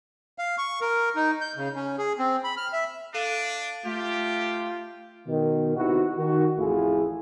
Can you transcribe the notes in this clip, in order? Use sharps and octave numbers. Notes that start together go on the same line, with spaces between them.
F5
C#6
A#4
D#4
G6
C#3
C#4
G#4
C4
B5
F6
E5
D4 A4 F5 D#7
A3 F4 G4
B2 D#3
C3 D#3 B3 E4 F#4
D#3 F#4
A1 F2 A3 E4 F4 G#4